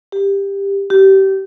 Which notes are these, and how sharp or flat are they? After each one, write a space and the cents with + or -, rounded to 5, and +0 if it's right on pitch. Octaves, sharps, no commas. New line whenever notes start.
G4 +15
G4 -25